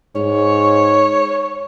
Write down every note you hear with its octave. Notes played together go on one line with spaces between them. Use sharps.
G#2 C#5